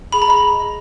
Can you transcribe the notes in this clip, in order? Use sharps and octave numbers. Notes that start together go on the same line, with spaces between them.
G#4 B5
A#5
D#5 B5
G#4
D#5